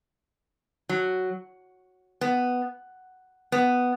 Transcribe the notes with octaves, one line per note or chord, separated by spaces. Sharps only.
F#3
B3
B3